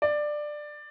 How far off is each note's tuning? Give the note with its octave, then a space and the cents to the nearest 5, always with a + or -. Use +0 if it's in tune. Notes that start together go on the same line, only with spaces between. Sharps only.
D5 +15